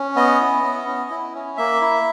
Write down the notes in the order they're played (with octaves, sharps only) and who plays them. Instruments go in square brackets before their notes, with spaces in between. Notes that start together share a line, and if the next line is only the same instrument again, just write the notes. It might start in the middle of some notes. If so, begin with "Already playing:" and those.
Already playing: [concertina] C#4
B3 D#5
E4
B3
C#4
E4
C#4
A#3 E5
E4